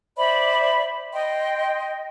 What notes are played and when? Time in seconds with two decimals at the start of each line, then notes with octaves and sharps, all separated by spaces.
0.17 C5 D5 E5 B5
1.13 D#5 G5 C6